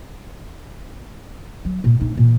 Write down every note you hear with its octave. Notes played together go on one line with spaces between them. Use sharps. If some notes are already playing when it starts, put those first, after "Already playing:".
F#3
A#2
A#1 D#4
A#2 E3